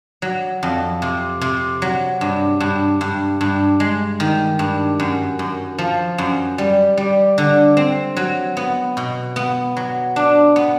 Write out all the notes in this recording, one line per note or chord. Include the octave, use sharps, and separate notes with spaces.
F#3
F2
C3
C3
F#3
G2
G2
G2
G2
G#3
D#3
G2
F#2
F#2
F3
F#2
G3
G3
D3
C4
F#3
B3
B2
B3
F#3
D4
B3